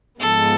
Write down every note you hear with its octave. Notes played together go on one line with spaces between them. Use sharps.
G#2 F3 G#3 B3 A4